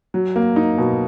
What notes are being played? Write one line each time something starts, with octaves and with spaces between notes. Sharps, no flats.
F#3
A#3
D#4
B2